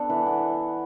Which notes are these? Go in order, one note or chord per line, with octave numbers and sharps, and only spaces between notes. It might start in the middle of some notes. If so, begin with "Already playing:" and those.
Already playing: B3 D4 A4
E3
B3